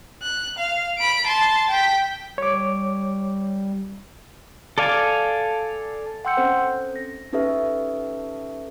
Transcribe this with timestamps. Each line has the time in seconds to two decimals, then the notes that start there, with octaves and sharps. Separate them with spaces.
0.22 F#6
0.58 F5
0.97 B5 D7
1.27 A5 C6
1.70 G5 B6
2.38 G3 C#5 D6
4.78 A4 D5 F5 G#5
6.25 F#5 G5 C6 E6 G6 C#7
6.37 C4 C#4 A4 C5
6.96 A#6
7.33 C#4 D#4 G4 A4 B4 E5